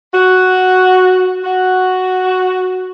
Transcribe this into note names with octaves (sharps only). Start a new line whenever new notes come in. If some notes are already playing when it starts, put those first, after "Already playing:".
F#4
F#4